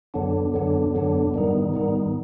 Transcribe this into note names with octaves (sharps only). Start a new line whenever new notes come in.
F#2 D3 F#3 B3 D4
F#2 D3 F#3 B3 D4
F#2 D3 F#3 B3 D4
G#2 D#3 G3 B3 D#4
G#2 D#3 G3 B3 D#4